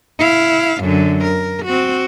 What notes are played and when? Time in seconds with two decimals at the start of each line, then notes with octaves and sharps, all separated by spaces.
0.19 E4 F5
0.83 F#2 D3
1.24 A#4
1.66 C4 F#4